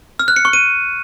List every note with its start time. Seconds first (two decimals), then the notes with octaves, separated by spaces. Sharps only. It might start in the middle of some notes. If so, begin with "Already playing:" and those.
0.19 F6
0.28 F#6
0.36 C#7
0.45 C#6
0.53 D#7